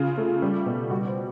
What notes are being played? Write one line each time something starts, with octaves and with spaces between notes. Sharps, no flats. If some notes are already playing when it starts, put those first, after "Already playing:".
Already playing: C#3 F4
A3
G3
B2
G3 F#4
C5